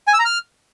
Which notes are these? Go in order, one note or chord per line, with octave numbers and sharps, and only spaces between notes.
G#5
E6
A#5
F6